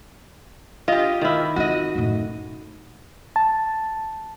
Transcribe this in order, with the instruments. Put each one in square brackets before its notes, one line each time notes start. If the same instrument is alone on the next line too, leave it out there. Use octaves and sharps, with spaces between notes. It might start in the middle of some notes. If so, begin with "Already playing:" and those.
[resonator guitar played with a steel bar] F4 G4 [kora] D#5
[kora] D#3 E4
[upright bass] C4 F4 [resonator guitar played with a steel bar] F#4 D#5
[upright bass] F#2 A2
[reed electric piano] A5